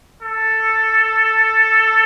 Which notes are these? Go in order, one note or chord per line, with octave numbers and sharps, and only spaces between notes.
A4